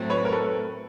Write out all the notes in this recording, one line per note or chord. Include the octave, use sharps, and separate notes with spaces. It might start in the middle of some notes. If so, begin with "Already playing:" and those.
Already playing: A2 F#3 A3 C4
B4 C#5
A#4
A4 B4